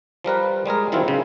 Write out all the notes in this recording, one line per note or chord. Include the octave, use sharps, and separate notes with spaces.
F3 G3 A#4 B4
G3 G#3 G#4 A#4
D#3 E3 F#3 C4 E4 F4
C#3